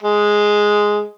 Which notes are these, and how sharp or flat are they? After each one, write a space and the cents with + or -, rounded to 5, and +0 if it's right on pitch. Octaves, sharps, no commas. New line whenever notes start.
G#3 +0